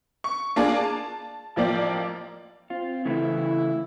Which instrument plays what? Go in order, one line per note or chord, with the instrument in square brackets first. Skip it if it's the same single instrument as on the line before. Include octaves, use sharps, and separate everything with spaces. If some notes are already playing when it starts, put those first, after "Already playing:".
[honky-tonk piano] C#6
A#3 D4 F4 G#4 D5
A5
A1 F3 A#3 D5 G5
[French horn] C4 [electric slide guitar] F4
[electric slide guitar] C#3 E3 A3 [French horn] E4